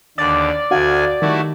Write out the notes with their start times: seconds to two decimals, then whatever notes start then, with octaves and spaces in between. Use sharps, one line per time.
0.18 D#2 D3 D5
0.71 D2 F#4 F5 F#5 G#5
1.22 D#3 G3 A3 E4 F#4